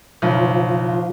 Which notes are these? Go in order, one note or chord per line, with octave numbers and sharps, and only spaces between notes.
F#1 B1 F3